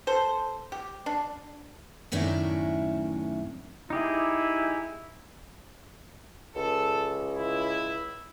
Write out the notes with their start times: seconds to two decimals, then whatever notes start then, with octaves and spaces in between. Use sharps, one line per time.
0.07 A4 C5
0.72 G4
1.06 D4
2.12 F#2 A2 D#3 C#4 D4 E4
3.90 D#4 E4 G4 G#4
6.55 C#2 A4
7.35 E4